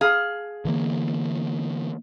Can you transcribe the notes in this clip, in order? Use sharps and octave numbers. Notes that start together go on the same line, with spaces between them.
G#4 F5
D3 E3 A#3